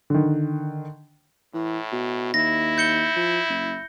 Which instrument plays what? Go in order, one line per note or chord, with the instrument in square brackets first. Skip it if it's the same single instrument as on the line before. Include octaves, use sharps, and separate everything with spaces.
[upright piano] D3 D#3
[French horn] A2 [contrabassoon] E3
[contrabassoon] B2
[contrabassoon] D#2 [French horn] E4 [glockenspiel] A#6
[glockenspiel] G6 C#7 G7
[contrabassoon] F3
F#1